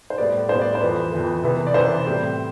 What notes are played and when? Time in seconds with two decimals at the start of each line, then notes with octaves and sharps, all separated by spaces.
0.10 C5
0.18 A2 G3 B3 D5
0.49 A2 G3 B3 C5
0.62 D5
0.75 C5
0.80 F2 E3 B3
1.12 F2 E3 B3
1.43 C3 E3 B3
1.67 D5
1.74 C3 E3 B3 C5
2.06 A2 G3 C4